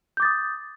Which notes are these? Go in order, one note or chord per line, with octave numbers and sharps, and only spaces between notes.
D6 D#6 G6 A6